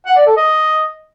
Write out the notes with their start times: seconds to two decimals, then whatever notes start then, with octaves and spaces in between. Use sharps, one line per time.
0.06 F#5
0.16 D5
0.27 A4
0.37 D#5